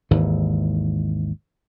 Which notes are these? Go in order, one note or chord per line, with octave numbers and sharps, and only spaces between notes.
G#1 D#2 G#2 E3